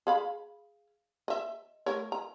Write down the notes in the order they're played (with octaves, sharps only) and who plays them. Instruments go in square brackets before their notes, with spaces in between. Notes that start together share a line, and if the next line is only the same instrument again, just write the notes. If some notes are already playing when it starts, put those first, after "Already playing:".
[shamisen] G#4 F5 B5
D#5 E5
A3 A#4 C#5
A#5